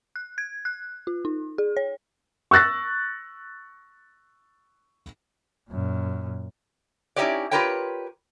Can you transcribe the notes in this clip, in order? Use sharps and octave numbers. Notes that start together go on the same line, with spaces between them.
F#6
G#6
F#6
F4
D#4
G#4
C#5
C#6 E6 F#6 A6 A#6
F#2 A#2
C#4 D#4 E4 G4 C#5 D5
F4 G4 A#4 B4 C#5 G5